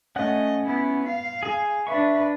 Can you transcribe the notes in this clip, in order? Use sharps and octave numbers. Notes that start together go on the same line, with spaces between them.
A3 C#4 D#5 F#5 F#6
B3 E4
F5
G#4 G#5
D4 B4 E5 C#6